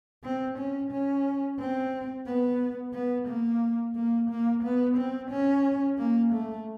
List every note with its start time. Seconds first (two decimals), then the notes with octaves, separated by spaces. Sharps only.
0.24 C4
0.58 C#4
0.92 C#4
1.59 C4
2.27 B3
2.94 B3
3.28 A#3
3.96 A#3
4.30 A#3
4.63 B3
4.98 C4
5.31 C#4
5.98 A#3
6.33 A3